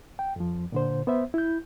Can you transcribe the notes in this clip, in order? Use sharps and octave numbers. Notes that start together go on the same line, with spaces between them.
G5
F2 F3
A#2 D3 C5
B3 C5 E5
E4 G6